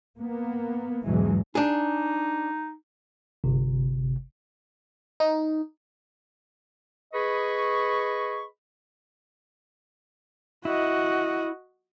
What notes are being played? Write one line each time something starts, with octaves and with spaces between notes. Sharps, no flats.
A#3 B3
E2 G#2 B2 E3 F#3 G#3
D4 D#4 G#4
G1 C3
D#4
G#4 B4 D#5 B5 C#6
E4 F#4 D#5